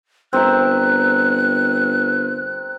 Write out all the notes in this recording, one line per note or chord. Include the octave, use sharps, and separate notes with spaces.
G1 C4 A#4 E5 F#6